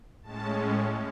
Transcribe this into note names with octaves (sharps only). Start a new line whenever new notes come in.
A2 G#3 C#4 A5